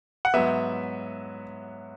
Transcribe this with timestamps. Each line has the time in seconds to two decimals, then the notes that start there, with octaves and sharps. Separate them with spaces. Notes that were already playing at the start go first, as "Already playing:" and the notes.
0.25 F#5
0.34 G#2 F#3 B3 E5